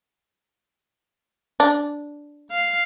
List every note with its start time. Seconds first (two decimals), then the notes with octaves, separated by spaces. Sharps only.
1.60 D4
2.51 F5